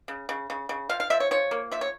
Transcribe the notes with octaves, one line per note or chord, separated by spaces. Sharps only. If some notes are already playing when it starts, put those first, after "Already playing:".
C#3
C#3
C#3
C#3
F3 F5
F5
F3 E5
C#5
F3 C#5
A#3
F3 E5
C#5